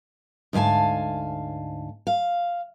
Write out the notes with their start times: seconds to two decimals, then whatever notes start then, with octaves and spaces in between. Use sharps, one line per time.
0.53 D2 G#2 F5 G#5 A5
2.07 F5